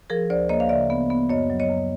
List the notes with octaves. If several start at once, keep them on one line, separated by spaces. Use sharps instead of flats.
F3 G#4 A#4
D2 C5 D5
A#3 C#5 D#5
F5
C#3 D5 E5
B3
B3
F#2 C#5 D#5
F#3
C#5 D#5
F#2